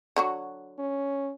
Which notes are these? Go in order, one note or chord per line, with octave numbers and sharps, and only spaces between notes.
D3 F#3 F#4
C#4